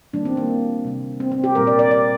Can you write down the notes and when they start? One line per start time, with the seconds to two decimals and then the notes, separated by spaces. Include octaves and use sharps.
0.13 D#3 G3 A#3 D4
0.25 C4
0.37 A#3
0.85 C3 G3 A#3
1.20 C4
1.32 C4
1.44 G4
1.55 A#2 G3 A#3 A#4
1.67 D5
1.79 D5
1.91 D5